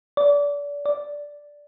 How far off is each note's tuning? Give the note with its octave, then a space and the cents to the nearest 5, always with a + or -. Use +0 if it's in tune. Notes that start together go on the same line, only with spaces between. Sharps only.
D5 -30
D5 -5